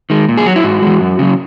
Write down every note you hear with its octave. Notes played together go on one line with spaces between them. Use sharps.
D#3 G#3
A#2
G#4
F#3 F#4
E4
G#2 F#4
E3 G#3
F#2
C#3 F#3